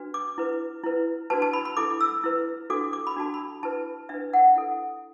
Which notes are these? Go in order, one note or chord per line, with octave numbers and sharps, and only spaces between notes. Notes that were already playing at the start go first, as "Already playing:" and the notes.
Already playing: D4 F#4 B4
D6
E4 B4
E4 B4
D4 F#4 B4 A5
A5
B5
B5
E4 A4 D6
E6
E4 B4
D4 F#4 A4 D6
D6
B5
D4 F#4 A4 A5
B5
E4 B4 A5
D4 B4 E5
F#5
E4 A4